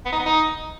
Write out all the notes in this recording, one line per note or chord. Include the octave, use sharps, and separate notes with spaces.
B3
D#4
B3
D#4